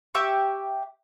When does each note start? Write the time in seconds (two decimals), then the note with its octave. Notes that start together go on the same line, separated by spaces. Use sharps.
0.15 G4 E5 C#6